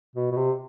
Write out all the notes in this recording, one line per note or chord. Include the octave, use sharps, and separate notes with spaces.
B2
B2
C3